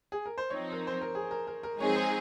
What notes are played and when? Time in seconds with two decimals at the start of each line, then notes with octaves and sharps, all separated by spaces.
0.12 G#4
0.26 A#4
0.38 C5
0.50 F3 C4 D#4 C#5
0.72 A#4
0.87 C5
1.02 A#4
1.15 G#4
1.31 A#4
1.47 A#4
1.63 A#4
1.79 F3 G#3 C4 D#4 G#4 C#5
1.96 C5